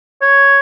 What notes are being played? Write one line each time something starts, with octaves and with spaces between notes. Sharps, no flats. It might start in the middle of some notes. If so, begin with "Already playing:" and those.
C#5